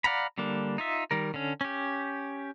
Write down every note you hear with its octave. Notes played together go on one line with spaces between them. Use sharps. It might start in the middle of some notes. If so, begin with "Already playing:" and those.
D5 F5 F#5 A#5 B5
D3 G3 A#3 D4
D#4 F4 E5
D#3 G3 A#4
D3 C#4
C#4 G4